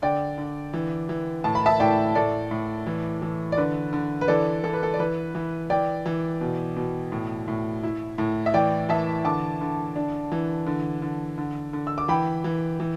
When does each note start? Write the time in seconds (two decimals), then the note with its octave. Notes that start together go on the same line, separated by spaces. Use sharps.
0.02 D3 D5 G5
0.38 D3
0.73 E3
1.09 E3
1.44 A2 A5
1.55 B5
1.66 E5 A5
1.80 A2 D5 G5
2.15 A2 A4 D5
2.51 A2
2.87 E3
3.22 E3
3.52 D5
3.57 D3 B4
3.93 D3
4.21 B4
4.28 E3 A4 D5
4.64 E3 A4
4.73 B4
4.83 A4
4.94 D5
4.99 E3 B4
5.35 E3
5.70 E3 D5 G5
6.06 E3
6.41 B2
6.76 B2
7.12 A2
7.48 A2
7.83 E4
8.18 A2
8.46 E5
8.54 E3 D5 G5
8.89 E3 E5 A5
9.24 D3 A5 D6
9.61 D3
9.96 D4
10.32 E3
10.67 D3
11.02 D3
11.38 D3
11.73 D3
11.87 E6
11.98 D6
12.08 E3 G5 B5
12.44 E3
12.80 E3